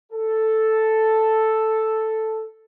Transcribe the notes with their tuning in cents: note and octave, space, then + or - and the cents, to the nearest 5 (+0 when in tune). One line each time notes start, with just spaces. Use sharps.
A4 +0